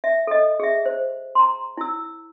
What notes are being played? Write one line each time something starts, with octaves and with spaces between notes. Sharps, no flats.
E5
A4 D#5
G#4 E5
C5
A#5 C6
E4 E6